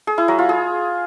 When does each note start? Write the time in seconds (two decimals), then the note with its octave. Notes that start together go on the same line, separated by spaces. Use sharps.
0.07 G#4
0.18 E4
0.28 F#3
0.39 F4
0.49 G#4